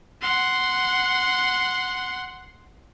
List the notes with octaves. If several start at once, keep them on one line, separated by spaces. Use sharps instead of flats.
F#5 C6